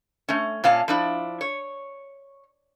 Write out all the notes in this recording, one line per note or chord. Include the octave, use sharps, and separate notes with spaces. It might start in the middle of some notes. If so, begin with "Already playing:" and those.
A3 C#4
A#2 C#4 F5 A5
F3 D4 E4
C#5